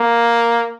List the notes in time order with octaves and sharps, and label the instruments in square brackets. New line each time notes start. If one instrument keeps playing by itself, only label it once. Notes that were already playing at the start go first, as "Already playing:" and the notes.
Already playing: [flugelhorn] A#3